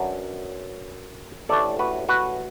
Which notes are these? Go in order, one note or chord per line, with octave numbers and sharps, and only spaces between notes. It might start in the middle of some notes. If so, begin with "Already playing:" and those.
Already playing: F#2 F#3 D4 B4
A1 A2 A3 D4 A4 D5
F#4 B4
F#4 B4